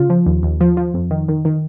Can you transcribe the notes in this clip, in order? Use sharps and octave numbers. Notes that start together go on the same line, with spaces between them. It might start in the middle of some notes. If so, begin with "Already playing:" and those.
Already playing: C#3 F4
F3
D#2
D#2
F3
F3
F2
D#3
D#3
D#3